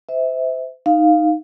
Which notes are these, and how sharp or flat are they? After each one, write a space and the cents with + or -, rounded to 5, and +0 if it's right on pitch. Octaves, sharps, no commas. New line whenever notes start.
C5 -30 E5 -20
D#4 +0 F5 +0